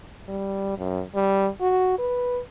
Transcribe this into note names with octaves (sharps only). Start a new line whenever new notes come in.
G3
F#2
G3
F#4
B4